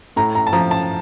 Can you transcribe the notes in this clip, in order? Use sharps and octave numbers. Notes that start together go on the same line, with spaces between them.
A2 A#5
A#5
A5
F3 A#5
A5